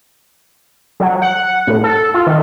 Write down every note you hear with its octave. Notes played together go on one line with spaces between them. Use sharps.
F#3
F#5
A2
A4
F4
D#3